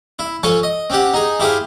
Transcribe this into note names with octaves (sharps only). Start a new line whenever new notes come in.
E4
F3 A4 C#5 G#5
D#5
C4 C#4 G4 F#5
D#4 G#4
E4 G4 G#4 C5 F5